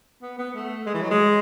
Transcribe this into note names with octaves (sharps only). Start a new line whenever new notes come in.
B3
B3
A3
G#3
E3
F#3
G#3